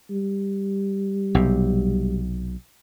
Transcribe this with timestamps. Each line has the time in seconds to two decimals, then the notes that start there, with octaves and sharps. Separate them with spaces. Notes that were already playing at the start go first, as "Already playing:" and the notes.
0.10 G3
1.35 B1 C3